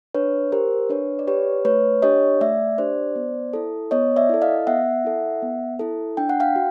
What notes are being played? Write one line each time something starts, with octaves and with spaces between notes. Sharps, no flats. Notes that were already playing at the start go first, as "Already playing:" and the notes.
D4 B4 C#5
G4 A#4 C5
D4 B4 C#5
D5
G4 B4 C#5
A3 B4 C#5
D4 G4 C#5 D#5
A3 D5 E5
D4 G4 C5 D5
B3
E4 A4
B3 C#5 D#5
D5 E5
E4 A4
D#5 F5
B3 E5 F#5
E4 A4
B3
E4 A4
D4 G5
F#5
F5 G5
F#4